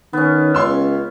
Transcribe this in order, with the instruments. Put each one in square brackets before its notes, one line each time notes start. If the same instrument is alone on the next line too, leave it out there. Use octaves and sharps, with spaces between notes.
[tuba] D#3 [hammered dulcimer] B3 C#4
[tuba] C#2 [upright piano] C#5 C6 E6